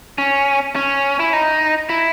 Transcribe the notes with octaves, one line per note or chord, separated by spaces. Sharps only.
C#4
C#4
E4
D#4
E4